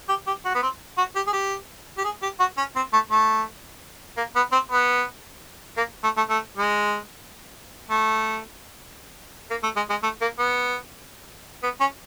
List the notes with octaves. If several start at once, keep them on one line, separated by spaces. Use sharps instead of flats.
G4
G4
F#4
B3
C4
F#4
G4
G#4
G4
G4
G#4
G4
F#4
C#4
C4
A3
A3
A#3
B3
C4
B3
A#3
A3
A3
A3
G#3
A3
A#3
A3
G#3
G#3
A3
A#3
B3
B3
C#4